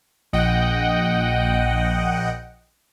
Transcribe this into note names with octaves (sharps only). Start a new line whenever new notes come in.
A#1 D#5 F#5 G5